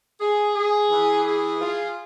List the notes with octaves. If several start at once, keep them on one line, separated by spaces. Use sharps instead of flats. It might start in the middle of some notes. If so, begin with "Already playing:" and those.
G#4
G#4
E3
G#4
F4